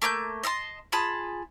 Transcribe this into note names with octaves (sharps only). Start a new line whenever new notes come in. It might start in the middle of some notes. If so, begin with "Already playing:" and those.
A3 A#3 G5 G6
D#5 E5 A5 C6
F4 G#4 A5 B5